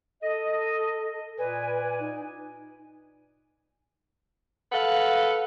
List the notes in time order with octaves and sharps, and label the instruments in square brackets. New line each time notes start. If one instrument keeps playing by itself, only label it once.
[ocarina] A4 [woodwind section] D#5
[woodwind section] A#2 D5 G#5 [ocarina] B4
[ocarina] D#4
[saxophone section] A4 B4 F5 F#5